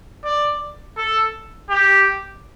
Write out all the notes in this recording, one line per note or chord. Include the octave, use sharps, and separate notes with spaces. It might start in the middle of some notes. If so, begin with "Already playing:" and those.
D5
A4
G4